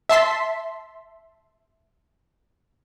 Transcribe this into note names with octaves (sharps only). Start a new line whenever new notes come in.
E5 A5 C6 B6